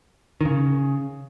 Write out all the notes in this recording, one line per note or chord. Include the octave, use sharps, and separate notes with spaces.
D#3
C#3